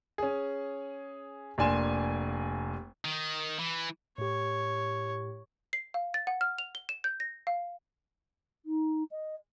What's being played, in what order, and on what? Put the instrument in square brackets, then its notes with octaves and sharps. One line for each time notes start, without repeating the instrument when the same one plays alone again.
[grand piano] C#4 G#4
F1 A#3 D4 G#5 C6 E7
[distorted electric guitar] D#3
E3
[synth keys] A2 G4 [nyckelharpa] C#5
[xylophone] C7
F5
A6
F#5
F6
F7
G7
E7
G6
A#6
F5
[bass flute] D#4
D#5